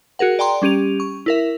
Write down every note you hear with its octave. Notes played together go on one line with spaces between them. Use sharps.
F#4 G#4 A#4 F#5
D5 G5 A#5 C6
G3 C#4 G4 D#7 F7
C#6
E4 A#4 E5